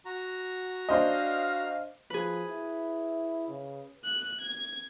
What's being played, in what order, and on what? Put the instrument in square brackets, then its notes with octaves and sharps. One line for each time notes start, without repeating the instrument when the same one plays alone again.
[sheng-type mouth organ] F#4 A#5
[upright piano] D4 C5 D#5 [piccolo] F5
[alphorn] F3 [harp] G#4 B4
[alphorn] E4
C#3
[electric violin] F#6
G#6